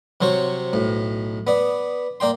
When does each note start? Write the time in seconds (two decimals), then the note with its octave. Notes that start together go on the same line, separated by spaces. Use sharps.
0.21 C3 F#3 C5 C#5 C#6
0.73 B1 A2
1.47 B3 D5
2.20 A#3 D5 G5 C6